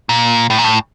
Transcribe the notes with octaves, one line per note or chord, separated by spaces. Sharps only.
A#2
A2
A#2
A2